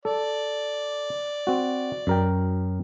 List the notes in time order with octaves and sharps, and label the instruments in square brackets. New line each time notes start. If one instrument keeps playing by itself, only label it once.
[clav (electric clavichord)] A4 [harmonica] D5
[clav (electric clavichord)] C4 F#4
F#2 A#4 G5